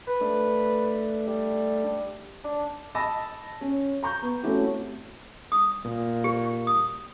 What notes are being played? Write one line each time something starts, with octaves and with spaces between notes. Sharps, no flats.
B4
A3 D4
G3
D4
D#5 A5 B5 E6 A#6
C#4
A#5 C#6 G6
B3
A3 C4 C#4 E4 F#4 G4
D#6
A#2
G4
D#6